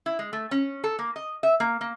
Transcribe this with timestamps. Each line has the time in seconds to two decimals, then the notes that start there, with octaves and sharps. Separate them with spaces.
0.06 E4
0.19 G#3
0.33 A3
0.51 C#4
0.84 A4
0.99 A#3
1.16 D#5
1.43 E5
1.60 A#3
1.81 A#3